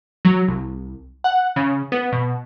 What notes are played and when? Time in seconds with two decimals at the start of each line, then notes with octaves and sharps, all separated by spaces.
0.25 F#3
0.48 C2
1.24 F#5
1.56 C#3
1.92 B3
2.12 B2